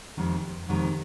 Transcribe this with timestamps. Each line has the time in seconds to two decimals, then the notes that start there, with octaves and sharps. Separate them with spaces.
0.17 F2 C3 D#3 G#3
0.68 F2 C3 D#3 G#3